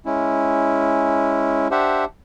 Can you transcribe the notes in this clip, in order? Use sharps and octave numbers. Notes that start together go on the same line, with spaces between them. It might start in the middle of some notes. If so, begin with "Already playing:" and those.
G#3 C#4 E4
D4 G4 C5 E5 F#5